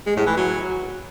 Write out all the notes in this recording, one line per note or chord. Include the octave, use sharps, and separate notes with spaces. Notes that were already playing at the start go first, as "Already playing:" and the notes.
G#3
A2
E3
F#3